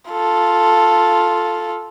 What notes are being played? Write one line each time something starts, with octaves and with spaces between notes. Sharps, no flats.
F4 A4